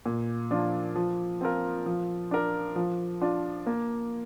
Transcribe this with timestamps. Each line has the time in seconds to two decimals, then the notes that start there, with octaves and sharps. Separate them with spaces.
0.06 A#2
0.51 F3 D4 F4
0.96 F3
1.41 C4 F4 A#4
1.86 F3
2.31 D4 A#4
2.76 F3
3.21 D4 F4
3.67 A#3